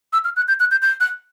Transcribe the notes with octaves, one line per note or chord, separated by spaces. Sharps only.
E6
F6
F#6
G6
F#6
G6
G6
F#6